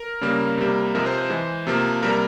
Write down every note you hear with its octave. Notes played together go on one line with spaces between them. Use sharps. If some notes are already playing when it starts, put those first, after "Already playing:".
Already playing: A#4
C#3 G3 A#3
C3 G3 A#3
C3 F3 G#3 A#4
C5
C5
E3 G#3
C3 F3 A#3
C3 G3 A#3 A#4